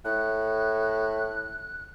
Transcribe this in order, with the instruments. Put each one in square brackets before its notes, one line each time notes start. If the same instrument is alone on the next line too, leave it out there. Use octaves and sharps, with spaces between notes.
[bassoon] A2 [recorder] F#6